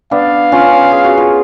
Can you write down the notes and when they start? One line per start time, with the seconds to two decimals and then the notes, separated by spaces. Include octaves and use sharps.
0.11 B3 D4 F5
0.52 C#4 F4
0.92 G#4
1.04 F#4
1.17 F4